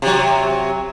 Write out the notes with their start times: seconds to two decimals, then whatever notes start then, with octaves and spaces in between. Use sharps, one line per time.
0.02 C3 F#3